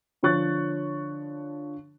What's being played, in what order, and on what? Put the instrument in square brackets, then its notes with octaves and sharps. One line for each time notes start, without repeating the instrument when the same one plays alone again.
[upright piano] D3 F3 C#5 C#6 F#6 A6